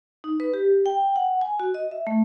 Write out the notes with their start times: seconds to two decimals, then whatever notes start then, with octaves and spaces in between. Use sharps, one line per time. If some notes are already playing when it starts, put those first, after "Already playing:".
0.24 D#4
0.40 B4
0.54 G4
0.86 G5
1.16 F#5
1.41 G#5
1.60 F#4
1.74 D#5
1.91 E5
2.07 A3